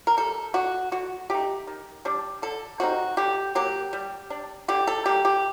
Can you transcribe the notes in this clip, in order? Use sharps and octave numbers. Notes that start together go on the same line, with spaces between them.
A#4
G3 A4
D4 F#4
D3 F#4
A3 D#4 G4
D#3
G3 D4
D3 A4
G3 C4 D#4 F#4
D3 G4
F#3 A#3 G4
G3
D4
D3 G4
A4
G3 A#3 G4
G4